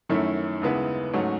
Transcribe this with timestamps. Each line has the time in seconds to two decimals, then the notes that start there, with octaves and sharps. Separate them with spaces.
0.09 F#2 D#3 A3 C#4 E4
0.62 D#2 C#3 G#3 B3 E4
1.13 G#2 F#3 A3 C#4